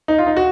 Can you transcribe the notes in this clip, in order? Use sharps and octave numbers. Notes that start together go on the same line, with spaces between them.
D#4
F4
D#4
F#4